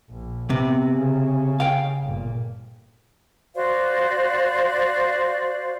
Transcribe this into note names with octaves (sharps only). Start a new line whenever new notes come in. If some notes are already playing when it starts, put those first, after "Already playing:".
A#1
C3 B3
C#3
F5 G5
G1 A#2
F#4 C5 D5 F5